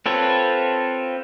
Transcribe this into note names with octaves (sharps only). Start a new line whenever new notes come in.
C4 F4 A4 B4 C#5